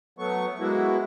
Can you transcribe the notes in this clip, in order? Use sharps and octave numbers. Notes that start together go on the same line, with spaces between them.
F#3 A3 B3 C#6
G#3 A#3 B3 E4 F#4